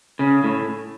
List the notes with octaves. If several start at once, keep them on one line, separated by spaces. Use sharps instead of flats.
C#3
A2